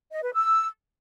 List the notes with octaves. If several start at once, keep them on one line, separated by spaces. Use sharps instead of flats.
D#5
B4
E6